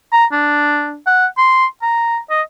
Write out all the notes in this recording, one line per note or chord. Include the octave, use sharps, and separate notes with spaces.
A#5
D4
F#5
C6
A#5
D#5